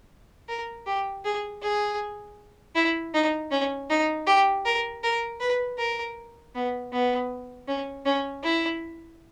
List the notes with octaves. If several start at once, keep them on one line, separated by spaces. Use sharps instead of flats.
A#4
G4
G#4
G#4
E4
D#4
C#4
D#4
G4
A#4
A#4
B4
A#4
B3
B3
C#4
C#4
E4